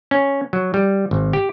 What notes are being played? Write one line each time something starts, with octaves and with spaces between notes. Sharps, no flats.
C#4
F#3
G3
G#1
G4